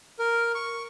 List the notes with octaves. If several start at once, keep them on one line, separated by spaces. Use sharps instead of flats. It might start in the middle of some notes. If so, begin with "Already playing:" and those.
A#4
C#6